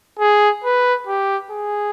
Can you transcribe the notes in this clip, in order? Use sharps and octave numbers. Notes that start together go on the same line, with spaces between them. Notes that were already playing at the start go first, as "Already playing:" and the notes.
G#4
B4
G4
G#4